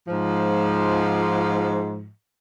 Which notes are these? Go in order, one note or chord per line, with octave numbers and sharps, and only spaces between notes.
G#2 F3